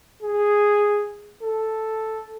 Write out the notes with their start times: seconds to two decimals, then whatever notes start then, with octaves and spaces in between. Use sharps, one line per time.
0.22 G#4
1.43 A4